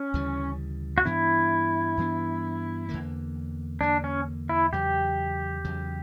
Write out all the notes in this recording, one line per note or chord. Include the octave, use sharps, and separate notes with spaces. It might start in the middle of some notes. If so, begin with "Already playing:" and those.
Already playing: C#4
D2 C#3 E3 G3
F#4
G2 E3 B3 D4 E4
G2 E3 B3 D4
E2 D3 A#3
E2 D3 A#3 D4
C#4
E4
E2 C#3 F#3 G4
E2 C#3 F#3